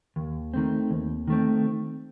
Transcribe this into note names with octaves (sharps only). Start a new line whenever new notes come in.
D#2
D#3 A3 C4
D#2
D#3 A3 C4